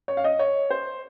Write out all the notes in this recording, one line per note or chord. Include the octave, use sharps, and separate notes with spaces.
C#5
F5
D#5
C#5
C5